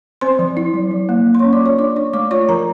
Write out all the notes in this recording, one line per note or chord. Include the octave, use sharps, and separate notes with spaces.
C4 C5 C6
F3
E4
F#3
F#3
A#3
A#3
C6
C#5 C#6
C#4
D5 D6
F4 C#5 C#6
D4 D5 D6
D4 C#5 C#6
A3 D5 D6
F4 C#5 C#6
F3 A#4 A#5